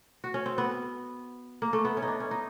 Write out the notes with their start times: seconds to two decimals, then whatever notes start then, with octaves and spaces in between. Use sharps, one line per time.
0.24 F#4
0.34 C#4
0.46 C4
0.58 B3
1.62 A#3
1.73 A3
1.85 B3
1.97 C#4
2.02 D#4
2.08 D4
2.20 C#4
2.31 D#4